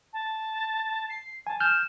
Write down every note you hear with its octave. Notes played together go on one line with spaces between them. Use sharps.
A5
C7
G#5 A5
F6 G6 E7